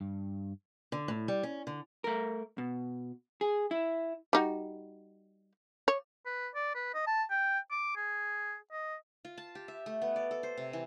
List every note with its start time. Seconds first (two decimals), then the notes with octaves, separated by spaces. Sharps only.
0.01 G2
0.92 D3
1.08 A2
1.28 G3
1.43 C#4
1.67 D3
2.04 A3 A#4
2.58 B2
3.41 G#4
3.71 E4
4.33 G3 D#4 F#4
5.88 C#5
6.26 B4
6.55 D5
6.75 B4
6.94 D#5
7.07 A5
7.31 G5
7.71 D6
7.96 G#4
8.72 D#5
9.25 F4
9.38 A5
9.55 G4
9.68 E5
9.86 A3
10.02 B3
10.16 D5
10.31 A4
10.43 C5
10.57 C3
10.73 E3